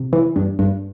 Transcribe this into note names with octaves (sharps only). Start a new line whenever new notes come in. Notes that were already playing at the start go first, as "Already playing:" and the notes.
Already playing: C3
E3
G2
G2